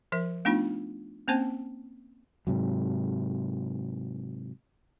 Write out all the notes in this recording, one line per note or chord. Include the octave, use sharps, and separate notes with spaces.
F3 A#4 E5
A3 B3 D4 D#4 F4
A#3 C4 C#4 C5 G5 A5
G#2 C3 F#3